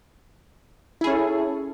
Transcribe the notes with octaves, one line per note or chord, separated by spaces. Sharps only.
C#4 E4 G#4 A4